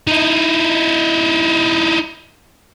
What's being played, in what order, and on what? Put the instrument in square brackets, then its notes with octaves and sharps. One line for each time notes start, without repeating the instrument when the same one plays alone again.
[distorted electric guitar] D#4 E4